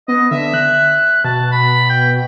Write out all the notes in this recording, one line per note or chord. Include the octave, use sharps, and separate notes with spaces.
B3 D#5
D3 E5
F#6
B2 A5
B5
G5